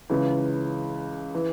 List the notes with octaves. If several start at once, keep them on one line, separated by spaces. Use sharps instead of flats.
C#2 C#3 E3
E3